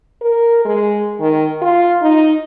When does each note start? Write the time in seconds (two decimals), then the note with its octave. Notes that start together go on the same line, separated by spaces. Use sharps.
0.22 A#4
0.65 G#3
1.20 D#3
1.62 F4
2.01 D#4